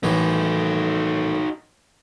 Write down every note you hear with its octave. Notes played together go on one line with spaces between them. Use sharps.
A2 D#3 E3 D#4 F#4